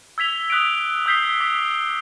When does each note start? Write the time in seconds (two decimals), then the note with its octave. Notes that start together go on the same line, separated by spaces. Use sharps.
0.18 E6 G#6 B6 F7 G7
0.50 D#6 F#6 B6 D7
1.06 D#6 E6 G6 B6 C7 G7
1.40 D6 B6